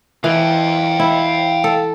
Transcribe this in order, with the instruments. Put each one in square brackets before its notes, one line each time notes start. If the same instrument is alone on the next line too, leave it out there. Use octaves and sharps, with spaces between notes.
[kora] E3 [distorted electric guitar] F5 G5
[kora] E4
A4